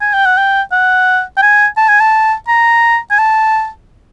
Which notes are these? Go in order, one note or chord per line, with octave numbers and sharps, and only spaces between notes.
G#5
G5
F#5
G5
F#5
G5
G#5
A5
G#5
A5
A#5
G#5
A5